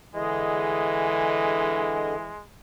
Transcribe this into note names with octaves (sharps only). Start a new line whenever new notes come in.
D3 E3 G#3 G#4 D#5